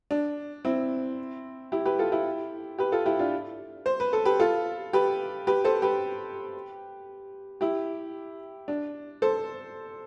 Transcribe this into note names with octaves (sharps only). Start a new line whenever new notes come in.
D4
C4 E4
E4 G4
G4 B4
F4 A4
E4 G4
G4 B4
F4 A4
E4 G4
D4 F4
C5
B4
A4
G4 B4
F4 A4
G4 B4
G4 B4
A4 C5
G4 B4
E4 G4
D4
A4 C5